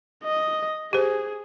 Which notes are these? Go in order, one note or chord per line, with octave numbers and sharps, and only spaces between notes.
D#5
G4 G#4 C5